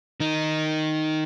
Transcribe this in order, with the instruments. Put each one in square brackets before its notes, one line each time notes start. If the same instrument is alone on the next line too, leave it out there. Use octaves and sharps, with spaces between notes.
[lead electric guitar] D#3 D#4